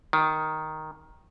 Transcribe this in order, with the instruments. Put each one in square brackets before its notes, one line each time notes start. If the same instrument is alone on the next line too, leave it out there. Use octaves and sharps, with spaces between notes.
[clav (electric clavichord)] D#3